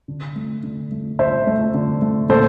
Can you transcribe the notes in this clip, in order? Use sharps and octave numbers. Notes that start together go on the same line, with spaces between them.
D3
A3
D3
A3
D3 C5 E5
A3
D3
A3
A#2 A4 C5